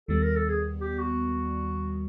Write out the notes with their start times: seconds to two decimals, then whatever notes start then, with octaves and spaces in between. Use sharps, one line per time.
0.08 D#2 D#3 G3 B3 A4
0.22 A#4
0.36 A4
0.49 G#4
0.81 G4
0.99 F#4